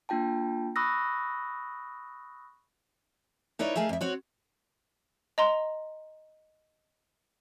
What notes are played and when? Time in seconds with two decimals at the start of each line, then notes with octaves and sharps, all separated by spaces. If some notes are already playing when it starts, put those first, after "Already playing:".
0.09 A#3 D4 F4 G5 A5
0.76 B5 C#6 D#6 E6 F#6 A#6
3.59 D#4 E4 B4 C#5 D5
3.75 D#3 A3 G#4 E5 F5
3.89 F2 E5
4.01 C4 F#4 C#5 F#5
5.38 D#5 A#5 C6